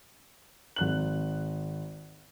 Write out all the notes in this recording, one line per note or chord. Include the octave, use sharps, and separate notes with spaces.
G#1 F#6 F#7